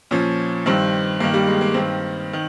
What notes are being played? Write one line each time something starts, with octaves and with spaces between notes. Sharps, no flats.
A#2 F3 C#4
G2 D#3 C4
G2 D#3 A#3
G3
G#3
A#3
G2 D#3 C4
D#3